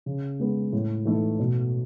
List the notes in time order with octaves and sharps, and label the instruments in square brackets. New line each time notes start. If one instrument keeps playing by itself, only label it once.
[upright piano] C#3
G#3 B3
A2
E3 A3 D#4 A4
B2